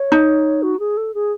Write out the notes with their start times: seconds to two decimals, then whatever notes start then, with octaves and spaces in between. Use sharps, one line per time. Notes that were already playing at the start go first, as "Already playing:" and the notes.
Already playing: C#5
0.12 D#4
0.63 F#4
0.79 G#4
0.97 A4
1.14 G#4